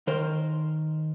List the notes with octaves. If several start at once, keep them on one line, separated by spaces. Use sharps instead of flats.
D#3 A#4 C5